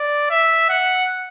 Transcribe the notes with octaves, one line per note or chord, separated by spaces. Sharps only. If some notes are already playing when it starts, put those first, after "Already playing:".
Already playing: D5
E5
F#5